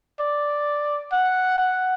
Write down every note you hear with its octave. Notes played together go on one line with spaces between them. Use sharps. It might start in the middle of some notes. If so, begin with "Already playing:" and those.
D5
F#5
F#5